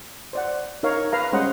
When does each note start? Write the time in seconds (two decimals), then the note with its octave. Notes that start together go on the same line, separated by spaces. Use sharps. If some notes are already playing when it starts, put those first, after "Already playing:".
0.33 C5 D5 F#5
0.83 D#4 A#4 C#5 F5
1.12 B4 F5 A#5
1.32 G3 G#3 C#4 C5 D#5 F#5